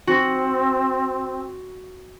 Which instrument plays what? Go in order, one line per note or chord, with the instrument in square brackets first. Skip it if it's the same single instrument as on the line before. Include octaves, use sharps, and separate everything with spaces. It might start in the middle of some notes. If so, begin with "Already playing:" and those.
[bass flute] C4 [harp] F#4